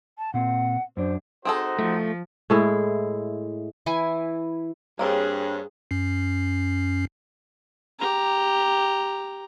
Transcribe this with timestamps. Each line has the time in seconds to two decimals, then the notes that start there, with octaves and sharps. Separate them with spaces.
0.18 A5
0.34 A#2 C4 F#5
0.97 F#2 D4 C5
1.45 C4 D#4 F#4 G#4 A4 C5
1.79 F3 A3
2.50 A2 G#3 E4
3.86 E3 E4 G#5
4.99 G2 A#3 C4 G#4 C#5
5.91 F#2 C#4 C7
7.99 G4 A#5